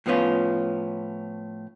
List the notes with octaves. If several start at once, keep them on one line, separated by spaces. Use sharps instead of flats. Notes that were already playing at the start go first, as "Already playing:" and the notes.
A2 F3 B3 C#4 F4